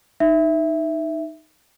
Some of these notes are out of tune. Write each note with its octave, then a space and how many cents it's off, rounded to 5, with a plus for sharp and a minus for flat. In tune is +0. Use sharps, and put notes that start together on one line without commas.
D#4 -5 E5 +0